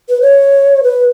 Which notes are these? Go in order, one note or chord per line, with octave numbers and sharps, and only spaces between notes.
B4
C#5
B4